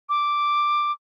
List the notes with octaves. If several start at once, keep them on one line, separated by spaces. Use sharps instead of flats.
D6